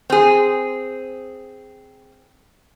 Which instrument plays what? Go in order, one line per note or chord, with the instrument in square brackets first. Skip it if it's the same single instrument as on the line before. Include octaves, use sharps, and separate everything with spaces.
[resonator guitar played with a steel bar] C4 G#4